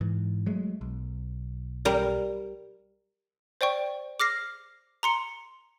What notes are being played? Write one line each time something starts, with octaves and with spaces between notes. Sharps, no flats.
G#2 E3
F#3 G#3 A3
B1
G3 A#4
C5 D5 G5 C#6
D6 F6 A#6 C7
A#5 C6 C#7